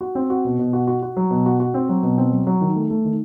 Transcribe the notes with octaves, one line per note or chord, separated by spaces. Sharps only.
F#4
C4
F#4
B2
B2
F#4
F#4
F#4
F#3
B2
F#4
F#4
C4
F#3
B2
C4
F#3
F#3
D#3
A3
A3
D#3